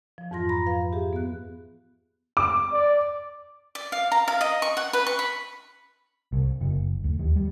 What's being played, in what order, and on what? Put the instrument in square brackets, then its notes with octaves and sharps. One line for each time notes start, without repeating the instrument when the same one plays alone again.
[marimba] F3
F2 G#2 E3 F4 C6 A#6
A#5 B5 A#6
F3 B4 F5
G4 G#4 E5
B3 F#6
[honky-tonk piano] D6
[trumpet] D5
[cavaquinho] D5
F5
A#5
F5
D#5
C#6
F#5
B4
C#6
B5
[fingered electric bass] C2
F#1
D2
D#2
G3